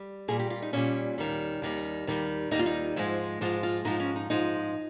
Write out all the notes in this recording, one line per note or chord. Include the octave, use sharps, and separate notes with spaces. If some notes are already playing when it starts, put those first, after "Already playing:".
Already playing: G3
A#2 G3 G#4
G4
F4
D#4
A#2 G3 C#4
D#2 D#3 G3
D#2 D#3 G3
D#2 D#3 G3
D#2 D#3 G3 D#4
F4
D#4
G#2 F3 G#3
G#2 F3 G#3 F4
F4
G#2 F3 G#3 D#4
C#4
D#4
G#2 F3 G#3 D#4